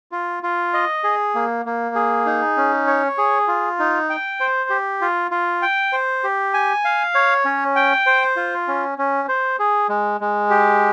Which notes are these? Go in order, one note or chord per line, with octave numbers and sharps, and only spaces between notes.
F4
F4
D#5
G#4
A#3
A#3
G#4
D#4
C#4
C#5
G#4
F4
D#4
G5
C5
G4
F4
F4
G5
C5
G4
G#5
F5
C#5
C#4
G5
C5
F4
C#4
C#4
C5
G#4
G#3
G#3
G4